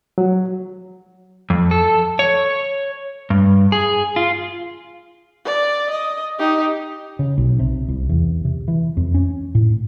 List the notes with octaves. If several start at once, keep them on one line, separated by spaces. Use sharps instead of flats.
F#3
F2
A4
C#5
G2
G#4
F4
D5
D#5
D#4 G4
C#3
B1
C3
C2
E2
C3
E3
F2
C#4
A2